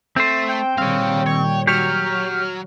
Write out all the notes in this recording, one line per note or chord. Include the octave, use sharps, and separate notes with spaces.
A3 C4 C5
G5
A#2 D#3 G3 C4 C#5 F5
C#5
F#3 G4 C#5 F6